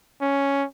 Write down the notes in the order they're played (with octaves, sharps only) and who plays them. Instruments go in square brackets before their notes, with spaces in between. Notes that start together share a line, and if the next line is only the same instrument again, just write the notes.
[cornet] C#4